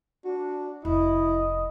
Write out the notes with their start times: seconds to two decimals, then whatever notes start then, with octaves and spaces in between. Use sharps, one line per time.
0.25 D4 F#4
0.85 F1 E4 D#5